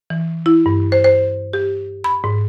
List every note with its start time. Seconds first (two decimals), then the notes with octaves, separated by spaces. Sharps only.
0.10 E3
0.46 E4
0.66 G2
0.92 C5
1.04 C5
1.53 G4
2.04 B5
2.24 G#2